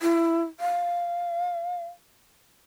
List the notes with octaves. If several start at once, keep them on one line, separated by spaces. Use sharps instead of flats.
E4
F5